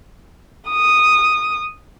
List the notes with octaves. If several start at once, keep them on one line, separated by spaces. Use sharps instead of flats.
D#6